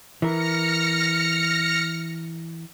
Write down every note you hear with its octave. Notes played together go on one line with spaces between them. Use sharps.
E3 A#4 F6 A#6 C#7